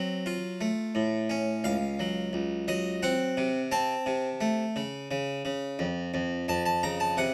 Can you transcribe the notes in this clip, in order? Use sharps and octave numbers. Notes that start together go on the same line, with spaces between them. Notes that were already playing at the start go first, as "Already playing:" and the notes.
Already playing: F#3 C4
F4
A3
A2
C#4
C#2 F5
F#3
C#2
F#3 D#5
C4 F#5
C3
C4 A5
C3
A3
C#3
C#3
C#3
F2
F2
F2 A5
A5
C#3 A#5
A5
C3 F#5